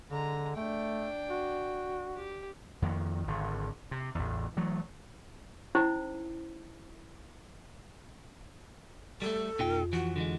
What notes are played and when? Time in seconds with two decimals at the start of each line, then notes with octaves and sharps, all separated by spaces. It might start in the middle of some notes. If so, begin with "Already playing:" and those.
0.11 D3 G#3 A#5
0.56 A3 D4 G5
1.30 F#4
2.15 G4
2.82 F2 D#3 A#3
3.28 G#1 D3
3.91 C3
4.15 A1 E2
4.57 E3 F#3 A3
5.75 C#4 D#4 E4 C5
9.22 G3 A3 A4
9.59 F2 B2 D#4 F4 G5
9.93 E3 F3 F#4
10.16 D3 E3 G#3